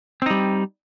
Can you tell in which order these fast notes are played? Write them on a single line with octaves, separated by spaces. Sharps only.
C4 D#4 G3